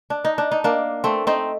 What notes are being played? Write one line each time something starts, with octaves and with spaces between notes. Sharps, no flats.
D4
D#4
D4
D#4
A#3 D4
A3 C4
C4 D#4